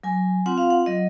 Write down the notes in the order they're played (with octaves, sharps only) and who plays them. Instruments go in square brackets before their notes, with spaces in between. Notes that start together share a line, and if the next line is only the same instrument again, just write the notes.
[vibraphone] F#3 G#5
C4 F4 F#5
F5
F#5
F#3 D#5